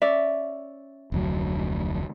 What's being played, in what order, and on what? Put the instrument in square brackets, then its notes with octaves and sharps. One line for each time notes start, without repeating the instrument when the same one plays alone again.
[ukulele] C#4 D5 E5
[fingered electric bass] F1 D2 F#3